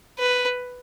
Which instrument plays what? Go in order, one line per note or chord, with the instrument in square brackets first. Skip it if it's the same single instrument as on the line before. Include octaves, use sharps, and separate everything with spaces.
[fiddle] B4